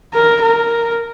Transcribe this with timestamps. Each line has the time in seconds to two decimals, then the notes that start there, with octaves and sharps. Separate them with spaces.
0.14 A#4
0.42 A#4